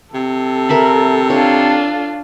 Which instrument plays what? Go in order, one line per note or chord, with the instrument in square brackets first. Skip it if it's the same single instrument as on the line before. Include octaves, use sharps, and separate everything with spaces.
[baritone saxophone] C3 [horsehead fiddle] A4
[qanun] A#4 E5 B5
[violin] D4 F4 [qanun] C#5